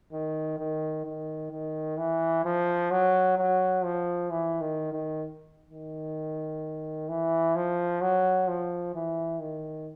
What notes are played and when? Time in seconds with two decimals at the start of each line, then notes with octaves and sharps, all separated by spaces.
0.13 D#3
0.59 D#3
1.05 D#3
1.52 D#3
1.98 E3
2.45 F3
2.91 F#3
3.38 F#3
3.85 F3
4.31 E3
4.61 D#3
4.93 D#3
5.70 D#3
7.09 E3
7.56 F3
8.02 F#3
8.48 F3
8.95 E3
9.41 D#3